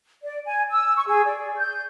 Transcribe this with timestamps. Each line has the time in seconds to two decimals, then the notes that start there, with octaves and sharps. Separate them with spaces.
0.24 D5
0.45 G#5
0.71 E6
0.96 C#6
1.07 G#4
1.26 D5
1.56 G6